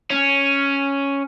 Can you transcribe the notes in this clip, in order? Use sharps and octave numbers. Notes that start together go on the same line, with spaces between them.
C#4